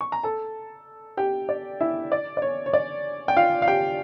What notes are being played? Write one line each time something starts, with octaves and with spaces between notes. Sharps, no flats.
C#6
A#5
A4 A5
G4 G5
D5
E4 E5
D5
D5
C#5
C#5
D5
G5
F4 F5
F5
G4 G5